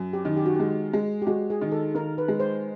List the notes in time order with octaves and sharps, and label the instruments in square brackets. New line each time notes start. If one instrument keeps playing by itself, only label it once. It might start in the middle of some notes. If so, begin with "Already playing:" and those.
Already playing: [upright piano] F#2
[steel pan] G4
[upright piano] D#3
[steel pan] G4
F#4
G4
[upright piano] G#3
G#3
[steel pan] G4
[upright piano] G#3 [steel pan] F#4
[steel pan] G#4
[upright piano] D#3
[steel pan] A4
[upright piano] D#3 [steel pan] A#4
[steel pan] B4
[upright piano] G#3
[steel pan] C5